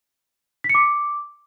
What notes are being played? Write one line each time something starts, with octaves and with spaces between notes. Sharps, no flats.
B6
C#7
D6